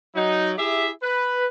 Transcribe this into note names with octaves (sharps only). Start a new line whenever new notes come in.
F#3 D#4
E4 G4 G#4 E5
B4